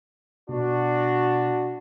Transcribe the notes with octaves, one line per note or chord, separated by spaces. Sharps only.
B2 D4 F#4